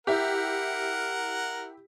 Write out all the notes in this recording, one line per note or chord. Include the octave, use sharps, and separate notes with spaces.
E4 G4 A#4 F#5